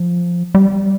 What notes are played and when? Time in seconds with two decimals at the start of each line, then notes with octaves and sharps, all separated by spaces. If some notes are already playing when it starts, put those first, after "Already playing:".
Already playing: F3
0.55 G3